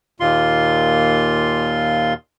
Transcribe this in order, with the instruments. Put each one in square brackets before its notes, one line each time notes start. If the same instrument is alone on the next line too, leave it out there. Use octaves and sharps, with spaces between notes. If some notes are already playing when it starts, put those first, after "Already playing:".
[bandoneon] D#2 A#2 F4 C6